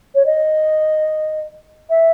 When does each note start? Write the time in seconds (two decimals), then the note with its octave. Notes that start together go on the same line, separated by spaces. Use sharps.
0.15 C#5
0.26 D#5
1.90 E5